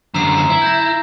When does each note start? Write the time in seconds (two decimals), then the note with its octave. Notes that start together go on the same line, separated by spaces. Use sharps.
0.14 F#2 D3 A#5 E6 C7
0.37 A#5
0.50 E4
0.62 G6 A#6